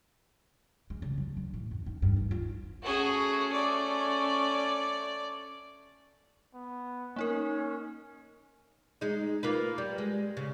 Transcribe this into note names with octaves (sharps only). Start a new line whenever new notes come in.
G#3
C#3
F#3
D3
A2
F2
D#4
G2
D#2
F4
A3 C#4 F#4 G#4
D5
B3
A#3 C#4 D#4 A#4
G#3 D#4
A#3 F4 B4
G3
G#3
C#3